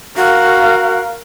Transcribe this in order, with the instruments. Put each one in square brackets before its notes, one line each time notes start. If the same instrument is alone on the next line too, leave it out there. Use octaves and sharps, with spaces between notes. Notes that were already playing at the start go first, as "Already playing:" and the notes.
[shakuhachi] F#4 [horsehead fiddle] A#4 F5